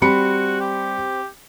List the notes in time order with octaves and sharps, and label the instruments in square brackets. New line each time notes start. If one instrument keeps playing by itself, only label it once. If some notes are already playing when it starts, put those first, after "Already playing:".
[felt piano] G3 B5 C#7 [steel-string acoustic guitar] C4 [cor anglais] F#4
[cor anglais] G4